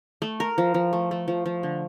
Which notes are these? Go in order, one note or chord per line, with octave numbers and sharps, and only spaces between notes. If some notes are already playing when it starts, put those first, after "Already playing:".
A3
A#4
F3
F3
A3
A3
F3
F3
D3